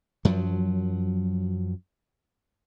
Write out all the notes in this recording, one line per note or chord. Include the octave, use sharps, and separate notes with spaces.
F#2 F3 F#3